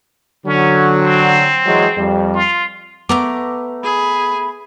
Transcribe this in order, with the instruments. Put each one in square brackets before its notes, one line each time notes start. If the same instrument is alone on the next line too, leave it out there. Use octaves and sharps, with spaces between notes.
[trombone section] D3 F#3 [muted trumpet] C#4
[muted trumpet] C4
[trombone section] E3 F#3 G#3
F2 G3
[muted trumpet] F4
[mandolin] A3 A#5 D6 [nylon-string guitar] B3
[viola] G#4 [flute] B5